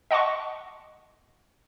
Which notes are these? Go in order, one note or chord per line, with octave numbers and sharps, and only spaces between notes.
D#5 F#5 A5 C6 C#6